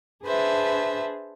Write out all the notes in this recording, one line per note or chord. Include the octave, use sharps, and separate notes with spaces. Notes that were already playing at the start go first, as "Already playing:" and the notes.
D4 G#4 B4 C5 E5 A5